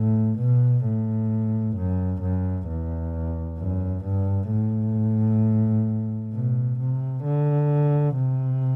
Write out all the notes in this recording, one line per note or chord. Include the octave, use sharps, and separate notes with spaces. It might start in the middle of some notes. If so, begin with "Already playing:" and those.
Already playing: A2
B2
A2
F#2
F#2
E2
F#2
G2
A2
B2
C3
D3
C3